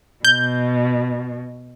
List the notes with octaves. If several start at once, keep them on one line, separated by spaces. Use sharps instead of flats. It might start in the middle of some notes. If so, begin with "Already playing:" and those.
B2 G6